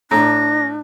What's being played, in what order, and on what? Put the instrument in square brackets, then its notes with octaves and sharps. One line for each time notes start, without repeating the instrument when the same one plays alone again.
[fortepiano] A2 [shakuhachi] D4 [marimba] A#5 [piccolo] A#6